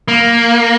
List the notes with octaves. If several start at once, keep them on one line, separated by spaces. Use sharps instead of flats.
A#3